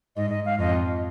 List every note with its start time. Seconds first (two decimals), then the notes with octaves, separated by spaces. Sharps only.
0.16 G#2 D#5
0.30 D#5
0.45 F5
0.59 F2 D#5